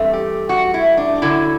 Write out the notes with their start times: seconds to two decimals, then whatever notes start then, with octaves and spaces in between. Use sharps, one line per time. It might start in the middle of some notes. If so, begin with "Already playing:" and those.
Already playing: G2 E3 A3 C4
0.13 G4
0.49 F#4
0.74 E4
0.97 D4
1.22 F#2 D3 F#3 E4